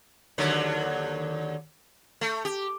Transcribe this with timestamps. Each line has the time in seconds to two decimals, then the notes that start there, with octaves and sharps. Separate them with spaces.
0.38 D#2 D3 F#3
2.21 A3
2.45 G4